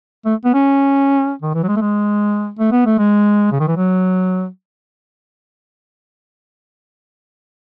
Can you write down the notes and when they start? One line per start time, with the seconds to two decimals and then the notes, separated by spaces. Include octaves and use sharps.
0.26 A3
0.45 B3
0.54 C#4
1.42 D#3
1.55 E3
1.63 F#3
1.68 G#3
1.76 A3
1.81 G#3
2.59 A3
2.72 B3
2.86 A3
2.99 G#3
3.52 C#3
3.60 D#3
3.68 E3
3.77 F#3